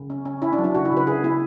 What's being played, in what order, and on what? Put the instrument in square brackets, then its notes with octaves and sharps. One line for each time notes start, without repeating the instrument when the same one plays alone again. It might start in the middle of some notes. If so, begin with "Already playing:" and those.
Already playing: [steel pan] C#3
C#4
C#4
C#4 E4
D4
F#3
D4
C#3 F#4
E4
C#3
B4
C#3 G#4
B3 E4